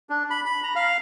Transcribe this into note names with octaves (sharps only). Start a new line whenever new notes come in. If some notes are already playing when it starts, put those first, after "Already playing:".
D4
B5
B5
A#5
F5